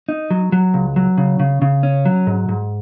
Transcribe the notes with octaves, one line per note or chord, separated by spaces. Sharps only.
D#4
F#3
F#3
C#2
F#3
C#3
C#3
C#3
C#4
F#3
G#2
G#2